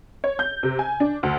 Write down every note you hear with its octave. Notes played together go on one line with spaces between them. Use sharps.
C#5
G6
C3
G#5
D4
D2